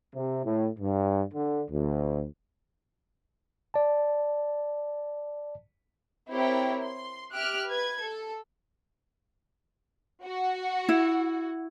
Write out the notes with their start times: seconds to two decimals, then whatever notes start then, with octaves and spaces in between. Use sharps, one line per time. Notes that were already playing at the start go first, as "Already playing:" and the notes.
0.15 C3
0.44 A2
0.79 G2
1.34 D3
1.71 D2
3.74 D5 A5
6.31 C4 E4 G4 A#4 C#5 G5
6.82 C6
7.33 G4 E5 F6 F#6 D7
7.68 B4 G#6
8.01 A4
10.23 F#4
10.89 E4